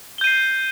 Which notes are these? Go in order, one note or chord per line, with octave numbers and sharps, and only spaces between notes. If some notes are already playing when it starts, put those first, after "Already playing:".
G6 C7 D#7 G7